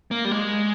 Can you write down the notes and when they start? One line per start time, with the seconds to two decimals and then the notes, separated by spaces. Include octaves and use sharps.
0.11 A#3
0.25 G3
0.31 G#3